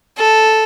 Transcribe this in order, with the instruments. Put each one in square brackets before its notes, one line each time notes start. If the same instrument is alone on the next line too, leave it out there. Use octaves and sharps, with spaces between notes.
[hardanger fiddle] A4